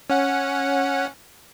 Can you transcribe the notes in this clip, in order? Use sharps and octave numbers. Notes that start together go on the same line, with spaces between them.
C#4 F#5